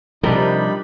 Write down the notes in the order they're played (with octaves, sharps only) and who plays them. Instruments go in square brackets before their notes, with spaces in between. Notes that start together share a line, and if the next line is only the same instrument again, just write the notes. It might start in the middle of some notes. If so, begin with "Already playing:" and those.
[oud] C3 A#4 [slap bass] F3 [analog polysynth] G3 D4 [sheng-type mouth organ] D#4 B5